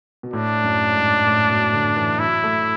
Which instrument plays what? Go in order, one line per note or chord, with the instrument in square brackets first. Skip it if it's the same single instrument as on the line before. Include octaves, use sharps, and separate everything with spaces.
[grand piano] B2
[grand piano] A2 [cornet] D4
[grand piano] F#2
G#2
A2
B2
D3
E3
[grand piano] F#3 [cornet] E4
[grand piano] A3